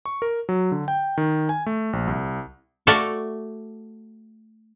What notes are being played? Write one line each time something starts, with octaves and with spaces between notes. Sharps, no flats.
C#6
A#4
F#3
D3
G5
D#3
G#5
A3
A#1
C2
A3 F#4 A4 D5 E5 F5